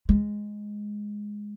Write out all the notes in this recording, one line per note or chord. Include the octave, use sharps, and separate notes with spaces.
G#3